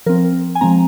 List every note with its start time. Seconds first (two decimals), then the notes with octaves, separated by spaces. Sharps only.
0.06 F3 C4 A#4
0.55 G#5
0.61 F3 G#3 C4 A#5